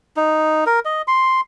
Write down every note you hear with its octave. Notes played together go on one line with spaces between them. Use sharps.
D#4
A#4
D#5
C6